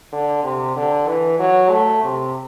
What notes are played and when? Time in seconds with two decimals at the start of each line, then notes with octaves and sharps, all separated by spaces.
0.13 D3
0.44 C3
0.76 D3
1.08 E3
1.39 F#3
1.71 A3
2.03 C3